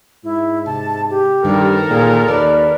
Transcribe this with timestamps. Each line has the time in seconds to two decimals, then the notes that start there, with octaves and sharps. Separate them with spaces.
0.24 G#2 E4
0.66 C3 A5
1.10 G4
1.45 G2 D#3 C4 A4 A#4
1.90 A#2 G#4
2.28 D#2 B4 D5